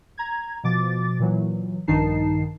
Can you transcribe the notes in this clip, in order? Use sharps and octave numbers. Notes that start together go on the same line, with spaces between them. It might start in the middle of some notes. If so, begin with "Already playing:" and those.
A#5 G#6
B2 F3 D6 A6
A#2 E3 F#3
A#1 G2 D#3 D#4 A5 C7